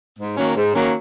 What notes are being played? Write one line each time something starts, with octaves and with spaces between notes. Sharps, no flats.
G#2
D#3 F#3 A#3 C#4
G#2
D#3 F#3 A#3 C#4